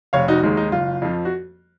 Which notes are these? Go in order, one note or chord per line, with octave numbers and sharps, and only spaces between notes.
F1 C#5 F5
D#4 F#4
D#2 D#3 G#3
D#4
F#1 F4
F2 F3
F#4